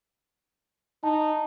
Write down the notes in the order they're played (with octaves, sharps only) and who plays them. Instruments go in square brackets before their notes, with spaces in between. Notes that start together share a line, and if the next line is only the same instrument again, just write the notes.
[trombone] D#4 [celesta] A5